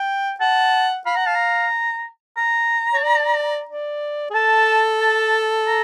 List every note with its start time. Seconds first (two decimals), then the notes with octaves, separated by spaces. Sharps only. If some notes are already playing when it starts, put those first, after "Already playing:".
Already playing: G5
0.40 F#5 A5
1.06 F5 B5
1.16 F#5 A#5
1.25 F5 A5
1.35 A#5
2.37 A#5
2.93 C#5
3.03 D5
3.69 D5
4.30 G#4
4.34 A4 A5
5.01 A5
5.67 A#5